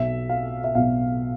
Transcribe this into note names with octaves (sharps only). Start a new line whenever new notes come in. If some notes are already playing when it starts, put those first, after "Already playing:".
Already playing: B1 B2 E5
F5
E5
B1 B2 F5